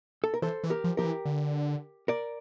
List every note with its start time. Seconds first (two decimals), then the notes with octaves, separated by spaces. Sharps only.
0.24 A4
0.34 A#4
0.42 E3 A4 C5
0.64 E3
0.70 G4 A#4
0.84 F3
0.97 F3 G4 A#4
1.05 E3
1.26 D3
2.08 A#4 D5